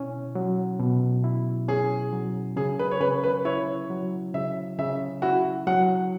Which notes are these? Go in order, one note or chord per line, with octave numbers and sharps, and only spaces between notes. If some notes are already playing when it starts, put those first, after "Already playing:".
Already playing: B2 C#4 E4
F#3
B2
E4
C#4 G#4
F#3
C#3 G#4
B4
C#5
C#3 B4
B4
E4 C#5
F#3
C#3 E5
C#3 E5
E4 F#4
F#3 F#5